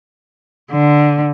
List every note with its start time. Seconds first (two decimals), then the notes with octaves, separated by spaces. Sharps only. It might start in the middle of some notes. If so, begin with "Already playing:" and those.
0.72 D3